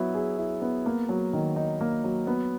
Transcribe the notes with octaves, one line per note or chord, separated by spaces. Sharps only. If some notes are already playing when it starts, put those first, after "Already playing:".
Already playing: F#3 B3 E4
G#4
E4
B3
A#3
F#3
D#3
D#4
A#3
F#3
B3